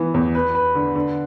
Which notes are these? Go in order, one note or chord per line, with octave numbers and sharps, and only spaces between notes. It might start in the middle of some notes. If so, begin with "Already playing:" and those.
Already playing: E3 B3
E2
B4
B4
D3
D3